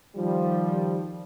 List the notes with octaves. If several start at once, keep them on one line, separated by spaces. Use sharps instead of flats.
D#3 F3 G3